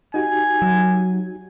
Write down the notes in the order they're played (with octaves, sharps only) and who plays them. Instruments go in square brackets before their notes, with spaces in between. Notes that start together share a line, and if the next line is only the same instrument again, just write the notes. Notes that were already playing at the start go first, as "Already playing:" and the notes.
[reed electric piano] D#4 F#4 G4 [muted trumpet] G#5
[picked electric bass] F#3